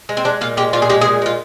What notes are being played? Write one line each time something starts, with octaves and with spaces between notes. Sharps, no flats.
G#3
C4
G#3 D4
A#2 F4
G#3 G4
A#2 F4
G#4
G#3 G4
G#4
A#2
G#3 F4